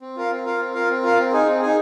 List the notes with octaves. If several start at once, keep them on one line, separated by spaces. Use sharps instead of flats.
C4
F4 A#4 F5
C4
F4 A#4 F5
C4
F4 A#4 F5
C4
F4 A#4 F5
C4
D#4 G#4
C4
D#4 G#4